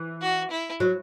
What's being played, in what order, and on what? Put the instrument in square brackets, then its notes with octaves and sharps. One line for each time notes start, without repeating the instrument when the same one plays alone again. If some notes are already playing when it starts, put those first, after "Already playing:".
Already playing: [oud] E3
[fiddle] F#4
E4
[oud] F#3